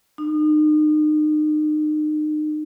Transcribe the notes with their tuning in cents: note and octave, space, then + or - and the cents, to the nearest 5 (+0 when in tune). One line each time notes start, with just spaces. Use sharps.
D#4 -35